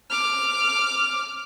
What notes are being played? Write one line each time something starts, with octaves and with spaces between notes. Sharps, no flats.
D6 F6